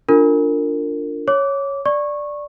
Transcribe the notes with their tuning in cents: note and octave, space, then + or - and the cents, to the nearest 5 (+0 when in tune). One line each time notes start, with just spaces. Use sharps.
D4 +0 F4 +0 A#4 -30
C#5 +0 D6 -20
D5 +0 C#6 -15